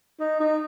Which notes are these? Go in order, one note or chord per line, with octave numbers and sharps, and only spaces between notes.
D#4
D#4